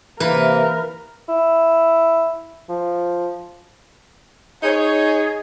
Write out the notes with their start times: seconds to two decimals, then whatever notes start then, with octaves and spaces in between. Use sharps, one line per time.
0.20 C3 E3 A#3 A#4 B4
1.29 E4
2.69 F3
4.63 D#4 G#4 C#5